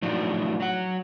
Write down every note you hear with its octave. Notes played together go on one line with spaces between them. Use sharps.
A2 F3 F#3 D4 D#4 F#4
F#3 F#5